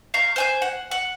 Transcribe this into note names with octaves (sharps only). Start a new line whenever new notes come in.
F5 A#5 C#6 G6
C5 G#5 G6
F#5
F#5